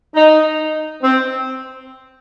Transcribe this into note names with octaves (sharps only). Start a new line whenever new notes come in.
D#4
C4